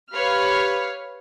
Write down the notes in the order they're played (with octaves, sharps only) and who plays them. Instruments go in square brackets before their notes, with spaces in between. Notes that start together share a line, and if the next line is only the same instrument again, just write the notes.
[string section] G4 B4 C#5 F5 B5 F6